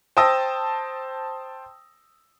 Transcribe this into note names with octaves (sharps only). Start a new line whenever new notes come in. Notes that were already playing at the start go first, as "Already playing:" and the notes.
C5 G5 A5 D#6 E6 A#6